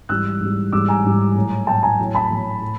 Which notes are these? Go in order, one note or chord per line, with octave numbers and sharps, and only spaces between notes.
G#2 E3 G3 E6 F#6
G#2 E3 G3
G#2 E3 G3 D6 E6
G#5 A#5
G#2 E3 G3
A2 F#3
A2 F#3 G5 A5
G#5 A#5
A2 F#3
A5 B5
A2 F#3
A2